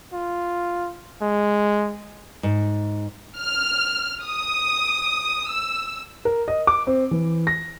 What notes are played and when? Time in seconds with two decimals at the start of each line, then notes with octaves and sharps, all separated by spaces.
0.13 F4
1.21 G#3
2.43 G#2
3.38 F6
4.24 D#6
5.51 E6
6.25 A#4
6.48 D#5
6.67 D6
6.87 C4
7.11 E3
7.47 A#6